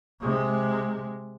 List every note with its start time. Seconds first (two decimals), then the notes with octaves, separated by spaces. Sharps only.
0.21 C3 G#3